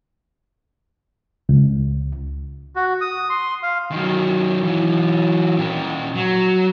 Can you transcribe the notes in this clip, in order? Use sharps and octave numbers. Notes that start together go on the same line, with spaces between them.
C#2
F#4
D#6
C6
F5
D#3 F#3
E3 F#3
A#2 G4
F#3